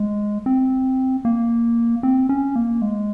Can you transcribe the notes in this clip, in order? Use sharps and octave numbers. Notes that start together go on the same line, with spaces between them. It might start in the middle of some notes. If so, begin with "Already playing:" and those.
Already playing: G#3
C4
A#3
C4
C#4
A#3
G#3